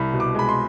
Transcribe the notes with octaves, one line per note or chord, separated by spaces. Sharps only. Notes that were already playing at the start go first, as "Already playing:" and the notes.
Already playing: C2 B5
B2
D6
G#3 B5
C6